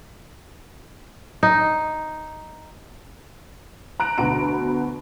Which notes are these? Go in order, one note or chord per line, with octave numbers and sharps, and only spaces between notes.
D#4
A#5 F#6 D7
D2 B2 B3 F#4 A#5 D7